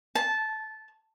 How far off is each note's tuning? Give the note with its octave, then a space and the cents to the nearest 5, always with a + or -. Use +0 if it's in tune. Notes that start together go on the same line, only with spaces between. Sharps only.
A5 -15